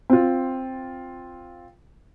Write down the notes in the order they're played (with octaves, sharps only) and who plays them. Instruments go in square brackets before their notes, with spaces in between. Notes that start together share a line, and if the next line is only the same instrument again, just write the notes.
[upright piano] C4 F4